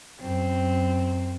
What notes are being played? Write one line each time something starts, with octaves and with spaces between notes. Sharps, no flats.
F#2 C4